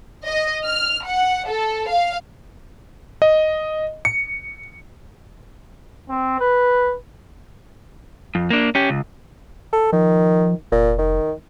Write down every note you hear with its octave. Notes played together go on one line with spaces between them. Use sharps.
D#5
F6
F#5
A4
F5
D#5
C#7
C4
B4
F2
A#3 D4
C#4 G4
C#2
A4
D#3 F3
F1 A#2
D#3